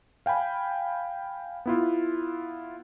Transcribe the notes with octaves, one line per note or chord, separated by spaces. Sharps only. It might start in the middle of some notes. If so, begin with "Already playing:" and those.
F5 G5 G#5 B5
B3 E4 F4